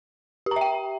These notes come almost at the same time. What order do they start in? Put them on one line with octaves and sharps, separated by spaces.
G4 A#5 E5 G5